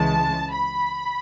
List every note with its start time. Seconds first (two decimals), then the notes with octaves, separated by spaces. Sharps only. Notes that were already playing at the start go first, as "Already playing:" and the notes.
Already playing: C#2 C#3 E3 G#3 A5
0.54 B5